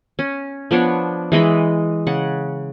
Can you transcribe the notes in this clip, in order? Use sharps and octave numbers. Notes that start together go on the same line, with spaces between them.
C#4
F3 B3 D4 C#5
E3 G#3 D#5 B5
C#3 F#5